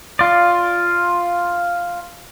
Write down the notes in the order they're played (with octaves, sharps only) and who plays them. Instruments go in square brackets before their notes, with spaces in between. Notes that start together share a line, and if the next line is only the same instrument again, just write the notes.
[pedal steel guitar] F4 D5